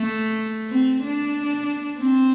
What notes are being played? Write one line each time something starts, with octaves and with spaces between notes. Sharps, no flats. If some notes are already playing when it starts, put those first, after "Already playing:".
Already playing: A3
C4
D4
C4